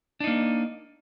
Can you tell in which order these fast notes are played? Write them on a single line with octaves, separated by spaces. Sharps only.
D4 D#4 A#3